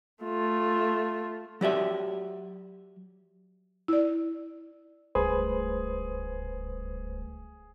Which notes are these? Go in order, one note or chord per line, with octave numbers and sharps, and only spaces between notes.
A3 F4
F#3 G4 D5 E5
E4 D5
D1 C#2 G3 A3 G#4 B4 C5